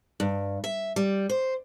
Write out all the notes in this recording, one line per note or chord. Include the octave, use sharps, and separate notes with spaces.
G2
E5
G3
C5